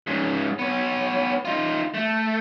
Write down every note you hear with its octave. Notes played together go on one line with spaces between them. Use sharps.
G#2 C#3
B3 C#5
D#4 F4
A3